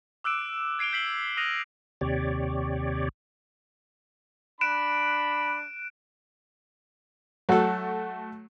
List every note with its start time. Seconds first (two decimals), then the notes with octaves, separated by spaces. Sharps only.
0.24 D6 E6 F#6 D7 E7
0.79 G#6 C7 D7 F7 G7
0.93 G6 B6 C7 F#7 G7
1.37 D#6 F6 F#6 A#6 D#7 F7
2.01 D#2 C3 G4 C#5 D5
4.61 D4 B5 F#6 D7 E7
7.49 F#3 A3 F#4 A4